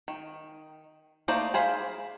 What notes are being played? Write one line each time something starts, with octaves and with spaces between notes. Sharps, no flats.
D#3
A3 A#3 D#4 C5 D5
G#4 C5 F5 B5